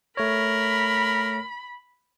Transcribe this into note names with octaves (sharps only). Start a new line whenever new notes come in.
A3 A#4 C#5 B5